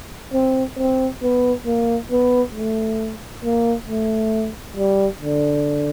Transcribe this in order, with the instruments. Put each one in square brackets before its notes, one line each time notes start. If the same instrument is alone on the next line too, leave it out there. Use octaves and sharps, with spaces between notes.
[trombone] C4
C4
B3
A#3
B3
A3
A#3
A3
G3
D3